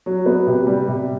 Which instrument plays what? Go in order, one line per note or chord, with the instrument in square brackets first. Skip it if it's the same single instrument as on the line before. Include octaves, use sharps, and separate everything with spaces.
[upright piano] F#3
B3
C3
G3
C3